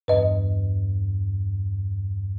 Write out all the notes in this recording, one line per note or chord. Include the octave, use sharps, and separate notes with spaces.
E2 G2 B4 D#5